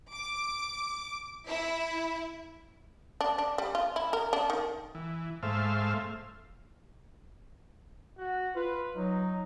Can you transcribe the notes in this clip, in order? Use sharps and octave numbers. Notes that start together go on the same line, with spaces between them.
D6
E4
D4
D4
G3
F4
E4
A#4
D4
D#3
E3
G#2 A3 C5 E5 F5
F#4
F4 B4
F#3 D#4